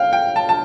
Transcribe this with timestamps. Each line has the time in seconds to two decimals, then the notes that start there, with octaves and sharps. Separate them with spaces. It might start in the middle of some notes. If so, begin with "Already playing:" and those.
Already playing: F5 G5
0.13 G5
0.36 A5
0.49 A5